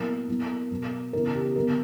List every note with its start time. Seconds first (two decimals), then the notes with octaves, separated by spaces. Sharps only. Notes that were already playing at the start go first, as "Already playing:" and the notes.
Already playing: A#2 F#3 B3 E4 A#4
0.28 F#3 B3 E4
0.71 B2 F#3 B3
1.13 C#3 E3 B3 E4 A#4
1.35 G4
1.56 D3 F#3 B3 A#4